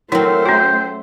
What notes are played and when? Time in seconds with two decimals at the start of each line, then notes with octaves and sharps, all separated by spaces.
0.12 F#3 A3 C4 E4 A#4 C5
0.46 C#4 F#4 G5